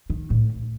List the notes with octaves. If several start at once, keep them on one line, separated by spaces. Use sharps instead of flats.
D#3
A2